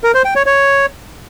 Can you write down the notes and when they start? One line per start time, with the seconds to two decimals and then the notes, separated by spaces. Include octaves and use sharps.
0.04 A#4
0.14 C5
0.25 G5
0.36 C#5
0.46 C#5